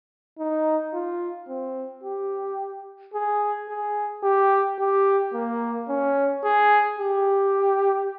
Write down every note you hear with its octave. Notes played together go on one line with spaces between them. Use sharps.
D#4
F4
C4
G4
G#4
G#4
G4
G4
A#3
C#4
G#4
G4